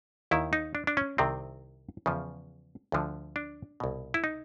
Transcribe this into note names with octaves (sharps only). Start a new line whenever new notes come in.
D#2 D#3 E4
D#4
D4
D4
C#4
C2 C3 D#3 C4
E2 C#3 F3
D2 D3 F3
D4
C2 B2
E4
D#4